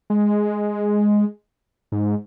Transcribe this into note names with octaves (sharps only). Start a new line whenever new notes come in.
G#3
G#2